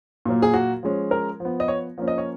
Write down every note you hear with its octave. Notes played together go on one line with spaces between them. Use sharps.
A#2 F#3 A#3
G#4
F#4
F3 G#3 C#4
A#4
F3 B3
D#5
C#5
F3 A#3 C#4
D#5
C#5